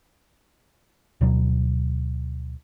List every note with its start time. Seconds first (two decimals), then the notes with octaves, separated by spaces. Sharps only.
1.21 D2 B2 F#3